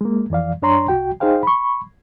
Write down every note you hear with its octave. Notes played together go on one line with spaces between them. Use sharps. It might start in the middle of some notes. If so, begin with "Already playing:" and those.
G#3 A#3
F2 E3 D5 F5
F#2 D4 C#5 A#5 C6
C2 F#4 G5
D#4 G#4 C5 F5 G5
B5 C#6